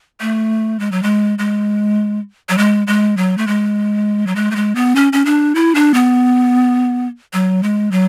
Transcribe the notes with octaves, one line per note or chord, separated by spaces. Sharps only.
A3
G#3
F#3
G#3
G#3
F#3
G#3
G#3
F#3
A3
G#3
F#3
G#3
A3
G#3
B3
C#4
C#4
D4
E4
D4
B3
F#3
G#3
F#3